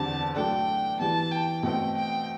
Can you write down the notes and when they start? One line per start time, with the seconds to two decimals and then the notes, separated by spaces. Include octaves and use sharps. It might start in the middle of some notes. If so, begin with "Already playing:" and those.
Already playing: E2 D3 G3 C4 A5
0.36 F#3 A3 D4 A4 G5
0.99 E3 G3 B3 A5
1.31 G5
1.63 B2 A3 C4 G5
1.96 G5